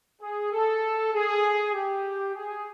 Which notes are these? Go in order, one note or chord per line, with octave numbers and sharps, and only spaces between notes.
G#4
A4
G#4
G4
G#4